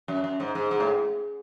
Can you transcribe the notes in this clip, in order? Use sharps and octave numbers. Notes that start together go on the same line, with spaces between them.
F#2
F#2
G#2
G#2
G#2
A2